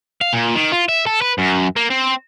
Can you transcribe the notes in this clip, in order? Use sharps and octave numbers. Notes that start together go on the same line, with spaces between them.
F5
A#2
D#3
F4
E5
A4
B4
F#2
A#3
C4